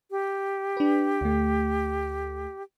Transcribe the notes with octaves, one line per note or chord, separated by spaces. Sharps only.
G4
D4 B4
D2 A3